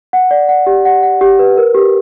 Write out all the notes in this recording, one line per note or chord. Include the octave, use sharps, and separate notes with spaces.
F#5
D5
F#5
G4
F#5
F#5
G4
B4
A#4
G4